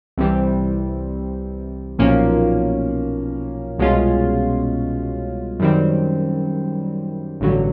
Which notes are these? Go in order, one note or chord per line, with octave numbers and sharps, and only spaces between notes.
C2 C3 E3 G3 C4
B1 A#2 F3 A#3 C#4
C2 B2 G#3 C#4 F4
F#2 D#3 G3 C4
A1 G2 D3 F#3